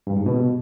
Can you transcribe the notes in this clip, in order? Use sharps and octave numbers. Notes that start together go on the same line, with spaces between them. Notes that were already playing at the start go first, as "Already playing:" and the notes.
G2
G#2
B2